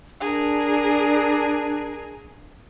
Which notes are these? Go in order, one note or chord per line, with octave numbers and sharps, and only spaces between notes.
D4 G#4 A#4